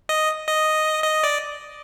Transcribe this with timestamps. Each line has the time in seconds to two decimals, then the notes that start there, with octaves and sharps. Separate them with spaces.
0.09 D#5
0.47 D#5
1.04 D#5
1.23 D5